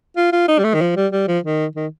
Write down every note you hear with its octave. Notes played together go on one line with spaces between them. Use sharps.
F4
F4
D#4
G3
A3
D#3
F3
G3
G3
F3
D#3
D#3